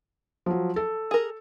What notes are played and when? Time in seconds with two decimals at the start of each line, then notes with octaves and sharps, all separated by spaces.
0.46 F3 F#3
0.76 A4
1.11 G#4 A#4